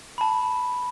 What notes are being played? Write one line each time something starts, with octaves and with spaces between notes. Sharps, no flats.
A5 B5